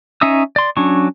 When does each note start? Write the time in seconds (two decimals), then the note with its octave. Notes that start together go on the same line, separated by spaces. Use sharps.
0.21 C#4 D#4 E5 D#6 E6
0.56 D5 C6
0.77 F#3 C#4 D4 C#6